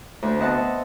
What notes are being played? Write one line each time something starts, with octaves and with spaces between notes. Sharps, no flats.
D2 D3
B3 C4 D#5 E5 F#5 A5